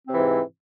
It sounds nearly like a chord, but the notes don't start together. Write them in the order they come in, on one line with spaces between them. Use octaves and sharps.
C4 C3 E3 G#2